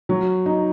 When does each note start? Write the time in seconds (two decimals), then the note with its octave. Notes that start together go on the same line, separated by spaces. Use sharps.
0.09 F#3
0.46 D#4